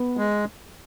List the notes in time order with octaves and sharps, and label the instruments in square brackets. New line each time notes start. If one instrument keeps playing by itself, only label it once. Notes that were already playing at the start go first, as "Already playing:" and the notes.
Already playing: [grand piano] B3
[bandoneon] G#3